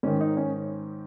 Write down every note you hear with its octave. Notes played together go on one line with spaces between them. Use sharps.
G#2 D#3 C#4
D#4
C#4